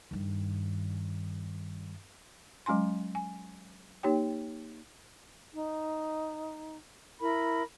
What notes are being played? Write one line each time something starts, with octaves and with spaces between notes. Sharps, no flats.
G2 D#3
F#3 G#3 C#4 G#5 C6
G#5
A#3 D#4 G4 C#5 G5
D#4
E4 A#4 B5